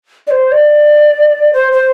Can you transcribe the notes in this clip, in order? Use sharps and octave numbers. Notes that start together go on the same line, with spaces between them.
D5
C5
D5
C5
C5